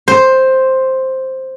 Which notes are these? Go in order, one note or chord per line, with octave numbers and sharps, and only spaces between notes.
C5